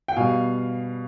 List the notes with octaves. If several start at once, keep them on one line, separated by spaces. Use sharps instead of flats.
G5
B2 G3 F5 G#5